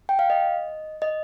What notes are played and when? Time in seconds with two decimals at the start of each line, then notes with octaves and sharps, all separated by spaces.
0.09 G5
0.19 F5
0.30 D#5
1.02 D#5